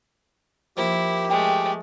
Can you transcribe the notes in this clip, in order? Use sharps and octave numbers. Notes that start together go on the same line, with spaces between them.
F3 A#3 E4 G4
G#3 A3 G5